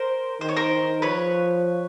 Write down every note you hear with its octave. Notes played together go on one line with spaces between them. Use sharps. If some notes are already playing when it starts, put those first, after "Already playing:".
Already playing: A#4 C5
D#3 C5
C#5
A#4 C5
D#3
F3 B4 C#5